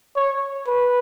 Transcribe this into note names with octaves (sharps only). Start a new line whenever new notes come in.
C#5
B4